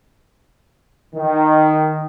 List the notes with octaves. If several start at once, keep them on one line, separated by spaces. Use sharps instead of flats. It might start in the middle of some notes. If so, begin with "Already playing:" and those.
D#3